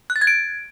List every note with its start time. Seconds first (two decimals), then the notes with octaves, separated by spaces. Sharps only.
0.10 F#6
0.16 A6
0.21 G#6
0.27 D7